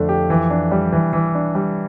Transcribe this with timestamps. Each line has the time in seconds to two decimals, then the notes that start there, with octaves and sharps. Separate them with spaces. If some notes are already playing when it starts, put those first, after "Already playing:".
Already playing: F2 D3 A3 D4
0.09 G4
0.30 E3
0.50 D4
0.72 G3
0.92 E3
1.13 E3
1.35 D4
1.55 G3